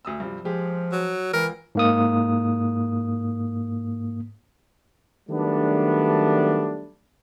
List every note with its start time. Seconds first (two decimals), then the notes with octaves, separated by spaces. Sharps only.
0.05 D2 D#6 E6
0.20 G2 C3 F3
0.45 F3 G#3 G4 G#4
0.92 F#3
1.34 C#2 E3 A#4
1.75 G#2 A#3 D#6
5.29 D#3 F#3 G3 A3 B3 D4